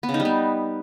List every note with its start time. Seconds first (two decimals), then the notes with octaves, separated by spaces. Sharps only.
0.03 B3
0.09 C#3
0.14 D#4
0.20 G3
0.25 B3